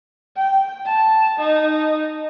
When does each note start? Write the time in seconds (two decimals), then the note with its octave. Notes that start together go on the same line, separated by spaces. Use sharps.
0.36 G5
0.85 A5
1.40 D#4